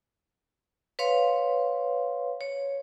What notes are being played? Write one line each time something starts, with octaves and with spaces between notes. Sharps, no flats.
B4 C#5 F5 C6
C#5